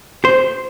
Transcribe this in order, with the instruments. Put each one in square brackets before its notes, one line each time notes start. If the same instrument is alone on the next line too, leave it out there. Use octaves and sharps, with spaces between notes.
[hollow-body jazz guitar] C5